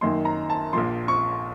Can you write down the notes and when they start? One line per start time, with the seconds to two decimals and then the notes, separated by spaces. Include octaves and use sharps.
0.01 F#2 D#3 A#3 D#4 C6
0.25 A#5
0.50 A5
0.73 A#1 A#2 F3 C6
1.08 C#6